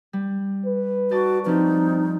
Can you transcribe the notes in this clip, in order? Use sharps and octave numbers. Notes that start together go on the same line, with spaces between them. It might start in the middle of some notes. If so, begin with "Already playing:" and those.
G3
B4
D#4 F#4 D5 A5
G2 F3 C4 D#4